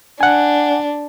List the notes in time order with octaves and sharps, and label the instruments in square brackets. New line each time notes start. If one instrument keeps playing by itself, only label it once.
[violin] D4 [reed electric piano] F#5 G#5